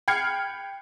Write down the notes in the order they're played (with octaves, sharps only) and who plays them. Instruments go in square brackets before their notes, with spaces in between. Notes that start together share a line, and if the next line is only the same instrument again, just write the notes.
[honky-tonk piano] G5 B5 F6 G#6 C7 C#7